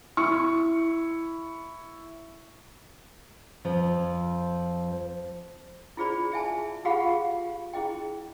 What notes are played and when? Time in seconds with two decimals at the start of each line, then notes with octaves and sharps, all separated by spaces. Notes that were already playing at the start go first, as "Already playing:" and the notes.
0.17 E4 C#6
3.65 F2 F3
5.97 E4 F4 G#4 C5 D5 B5
6.32 G#4 E5 G#5 A5
6.85 F4 G4 G#4 F5 F#5 B5
7.73 E4 G#4 D#5 G5